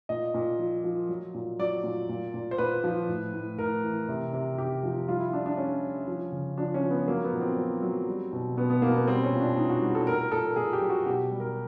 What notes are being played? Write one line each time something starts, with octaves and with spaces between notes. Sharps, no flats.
A#2 D#5
A#2
F3
F3
F#3
A#2
F#3 D5
A#2
A#2
A#2
C5
A#2 B4
F3
A2
A2
A2 A#4
E3
C3
C3
C3 G4
F3
G3 F4
E4
G3 D4
D4
G3 C#4
G3
F3
C#3
F3 D4
C#4
F3
B3
F#3 A#3
B3
A#2
C4
F#3
F#3
G3
B2
B2 B3
B3
B2 A#3
B3
G3 C4
C#4
A#2
D4
A#2 D#4
F#4
G3
A4
A#2 A#4
A#4
A#2 A4
A#4
A#2 G#4
G4
F#3
F#4
B2 G4
G3
A#4